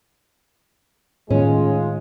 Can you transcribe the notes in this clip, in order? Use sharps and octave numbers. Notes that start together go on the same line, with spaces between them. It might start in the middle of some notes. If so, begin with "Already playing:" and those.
A2 D#3 G#3 C#4 F4